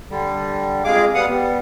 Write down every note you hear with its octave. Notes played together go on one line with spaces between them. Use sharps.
D3 G3
F2 G#3 G#4 F5 D6
G3 B3 F5 F#5 D#6
G3 B3